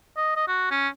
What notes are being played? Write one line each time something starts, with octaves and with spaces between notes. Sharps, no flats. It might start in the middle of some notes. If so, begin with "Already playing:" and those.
D#5
D#5
F#4
C#4